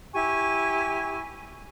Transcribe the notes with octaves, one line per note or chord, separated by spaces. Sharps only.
E4 G4 G#5 C#6